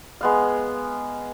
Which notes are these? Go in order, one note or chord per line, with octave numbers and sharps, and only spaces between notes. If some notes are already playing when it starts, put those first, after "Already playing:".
G#3 B3 F5